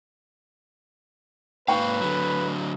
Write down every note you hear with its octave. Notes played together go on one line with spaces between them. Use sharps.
G#2 A#3 B4 F5 G5 C#6
D3 F#3